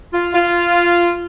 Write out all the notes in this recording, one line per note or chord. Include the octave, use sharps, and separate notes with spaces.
F4
F4